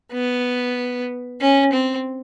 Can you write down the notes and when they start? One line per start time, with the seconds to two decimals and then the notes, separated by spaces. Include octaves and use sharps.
0.12 B3
1.41 C#4
1.73 C4